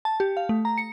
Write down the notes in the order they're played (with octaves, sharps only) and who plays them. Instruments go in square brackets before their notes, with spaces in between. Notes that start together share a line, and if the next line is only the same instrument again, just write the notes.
[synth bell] A5
G4
F5
A3
A#5
C#7